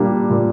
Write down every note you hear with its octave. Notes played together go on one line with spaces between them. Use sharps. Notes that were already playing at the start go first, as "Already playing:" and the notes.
Already playing: A#2 G3 A#3 D4
A#2